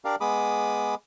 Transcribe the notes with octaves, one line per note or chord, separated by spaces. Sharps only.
D4 G4 A#4 D5 F5
G#3 B3 G#4 B5 D6 D#6